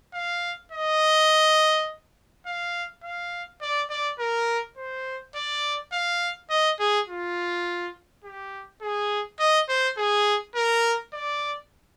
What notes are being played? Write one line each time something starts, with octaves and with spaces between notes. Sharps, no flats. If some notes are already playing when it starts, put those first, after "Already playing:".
F5
D#5
F5
F5
D5
D5
A#4
C5
D5
F5
D#5
G#4
F4
G4
G#4
D#5
C5
G#4
A#4
D5